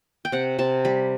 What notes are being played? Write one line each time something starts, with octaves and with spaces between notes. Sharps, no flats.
G5
C3 F#5
C3 A5
G3 B5